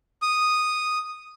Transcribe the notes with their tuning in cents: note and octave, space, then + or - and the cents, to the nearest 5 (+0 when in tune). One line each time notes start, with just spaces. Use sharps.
D#6 -5